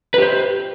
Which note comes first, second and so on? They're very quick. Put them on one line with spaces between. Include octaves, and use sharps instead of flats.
B4 G4 C5